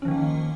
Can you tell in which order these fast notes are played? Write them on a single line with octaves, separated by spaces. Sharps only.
C#4 F3 D#3 A#3